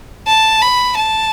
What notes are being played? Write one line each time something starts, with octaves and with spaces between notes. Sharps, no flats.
A5
B5
A5